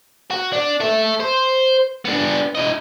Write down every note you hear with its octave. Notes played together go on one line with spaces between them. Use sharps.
F#4
D4
A4 E5
C5
B3 D4
E4 D#5